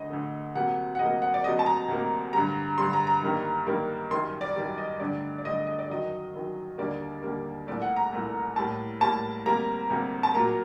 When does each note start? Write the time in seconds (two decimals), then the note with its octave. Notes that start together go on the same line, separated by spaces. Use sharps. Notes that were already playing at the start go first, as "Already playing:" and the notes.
Already playing: D2 D3 A3 D#5
0.10 D2 D3 A3
0.55 D2 C3 F#3 A#3 F#5
0.95 F#5
0.99 D2 C3 F#3 A#3 D#5
1.22 F#5
1.34 D5
1.44 D2 C3 F#3 A#3 D#5
1.59 A5
1.66 A#5
1.88 D2 C3 F#3 A#3
2.33 G2 D3 G3 A#5
2.78 G2 D3 G3 C6
2.93 A#5
3.07 A#5
3.22 G2 D#3 G3 A#3
3.66 G2 D#3 G3 A#3
4.11 F#2 D#3 G3 C6
4.41 D5
4.56 F#2 D#3 G3
4.78 D#5
5.00 G2 D3 A3 D5
5.38 D5
5.44 G2 D3 A3 D#5
5.67 D#5
5.79 D5
5.90 F#2 D#3 F#3 D#5
6.34 F#2 D#3 F#3
6.78 D#2 D3 G3 A#3 D5
7.23 D#2 D3 G3 A#3
7.67 C2 A#2 A3 D5
7.82 F#5
7.96 A#5
8.12 C2 A#2 A3
8.56 A2 G3 A#3 A5
9.00 A2 G3 A#3 A5
9.46 D2 C3 G3 A#3 A#5
9.90 D2 C3 G3 A#3
10.23 A5
10.34 A#2 F#3 A#3 A#5